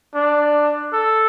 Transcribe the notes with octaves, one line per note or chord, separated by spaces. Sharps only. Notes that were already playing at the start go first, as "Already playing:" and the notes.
D4
A4